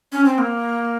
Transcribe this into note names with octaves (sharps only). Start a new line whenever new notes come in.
C#4
C4
A#3